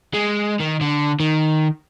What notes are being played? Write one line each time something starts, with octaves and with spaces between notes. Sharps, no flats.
G#3
D#3
D3
D#3